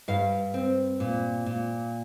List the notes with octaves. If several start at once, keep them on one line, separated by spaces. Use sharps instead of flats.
G2 F5
C4
A#2
A#2